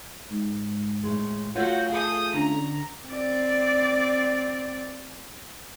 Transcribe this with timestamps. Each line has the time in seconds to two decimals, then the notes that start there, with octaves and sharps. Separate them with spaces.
0.30 G#2
1.04 A2 G#3
1.56 A3 F4 F#4 C#5 F5 G6
1.90 G#4 A4 F5 D#6
2.34 D3 C#4 A#5
3.08 C4 D5